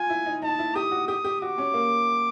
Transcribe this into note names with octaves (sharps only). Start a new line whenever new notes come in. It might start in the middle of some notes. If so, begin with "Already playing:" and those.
Already playing: F4 G#5
E4
D#4
D#4 A5
E4
G4 D#6
F#4
G4 D#6
G4
F#4 D6
C#4
A#3